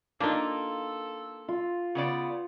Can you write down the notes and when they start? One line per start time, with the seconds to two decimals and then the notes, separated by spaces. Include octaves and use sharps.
0.20 A#3 D4 D#4 F4 A4
1.48 F4
1.95 C#3 B3 D5